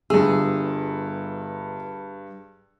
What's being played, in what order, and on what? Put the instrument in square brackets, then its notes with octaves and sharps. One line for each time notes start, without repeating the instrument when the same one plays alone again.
[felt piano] G1 [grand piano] G2 E6 [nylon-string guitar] G#4